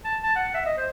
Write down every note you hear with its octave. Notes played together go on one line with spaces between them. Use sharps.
A5
A5
F#5
E5
D#5
C5